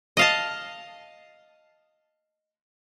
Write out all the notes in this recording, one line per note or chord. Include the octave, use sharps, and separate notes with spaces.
D#5 F5 A5